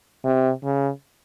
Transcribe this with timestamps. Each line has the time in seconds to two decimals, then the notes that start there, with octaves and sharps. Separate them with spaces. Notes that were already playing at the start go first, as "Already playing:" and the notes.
0.25 C3
0.64 C#3